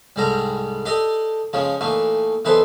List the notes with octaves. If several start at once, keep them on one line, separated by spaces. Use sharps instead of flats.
C2 G#2 G3 G#3 A4 A#5
D4 G4 A4 D5 D#5
C#3 F3 G#3 C#4
A#2 E3 A3 D#4
B1 E3 D#4 A4 B4 C5